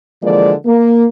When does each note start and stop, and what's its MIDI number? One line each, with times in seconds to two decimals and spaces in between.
0.23 0.52 50
0.23 0.52 52
0.23 0.52 53
0.23 0.52 56
0.23 0.52 58
0.23 0.52 74
0.65 1.05 58